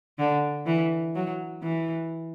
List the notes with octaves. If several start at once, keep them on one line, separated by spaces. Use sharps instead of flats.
D3
E3
F#3
E3